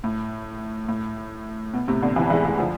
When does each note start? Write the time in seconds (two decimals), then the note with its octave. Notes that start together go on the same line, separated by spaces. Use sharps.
0.04 A2
0.88 A2
1.74 B2
1.88 A2 C3
2.02 B2 D3
2.16 C3 E3
2.30 E3 G#3
2.44 E3 G#3
2.59 D3 F3